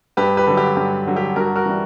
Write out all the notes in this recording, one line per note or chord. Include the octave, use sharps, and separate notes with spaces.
G2 G4 B4
G4 B4
D3 F#3
G4
G2 G4
D3 F#3
G4
G2 F#4 A#4
F#4 A#4
E3 G3